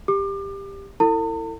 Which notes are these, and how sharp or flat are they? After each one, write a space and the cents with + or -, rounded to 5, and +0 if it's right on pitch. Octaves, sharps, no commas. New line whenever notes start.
G4 +15 D6 +35
E4 +0 A4 +40 A5 +45